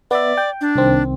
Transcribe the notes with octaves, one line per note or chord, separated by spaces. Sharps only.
B3 D5 E5
G5
D4
C2 D#3 C4